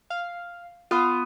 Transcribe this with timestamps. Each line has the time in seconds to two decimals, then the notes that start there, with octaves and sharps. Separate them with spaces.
0.10 F5
0.91 B3 F4